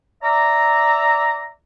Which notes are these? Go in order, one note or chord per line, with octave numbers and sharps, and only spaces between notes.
D5 E5 A#5